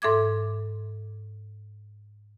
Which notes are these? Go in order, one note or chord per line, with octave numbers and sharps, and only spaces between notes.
G#2 A4 E5 D6 G#6